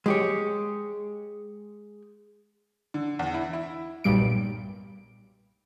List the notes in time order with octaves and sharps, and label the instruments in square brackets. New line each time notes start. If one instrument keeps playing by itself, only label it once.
[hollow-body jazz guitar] G#3 G4 C#5
[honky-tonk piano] D3
E2
E4
E4
[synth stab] B1 G2 A#2 G3 D7